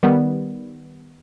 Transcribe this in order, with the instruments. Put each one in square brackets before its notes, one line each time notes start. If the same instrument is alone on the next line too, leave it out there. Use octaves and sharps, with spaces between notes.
[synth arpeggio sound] D#3 G3 B3